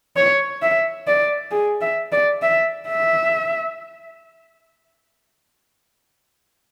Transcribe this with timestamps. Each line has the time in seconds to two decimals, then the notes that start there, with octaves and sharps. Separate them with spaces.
0.17 C#5
0.62 E5
1.07 D5
1.51 G#4
1.82 E5
2.12 D5
2.42 E5
2.88 E5